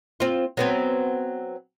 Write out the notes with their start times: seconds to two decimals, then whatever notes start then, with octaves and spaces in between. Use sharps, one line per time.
0.20 C4 F4
0.57 F#3 B3 C4